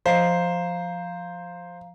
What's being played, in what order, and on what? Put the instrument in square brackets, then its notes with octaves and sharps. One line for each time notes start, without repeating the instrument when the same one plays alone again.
[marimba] F3 D#5 [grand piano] C5 [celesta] F5 A#5 C7